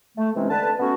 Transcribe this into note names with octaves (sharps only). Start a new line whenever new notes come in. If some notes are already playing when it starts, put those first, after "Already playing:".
A3
C3 E3 G#3 C4 C#4 D#4
D3 B4 A5
A3 B3 C#4 F#4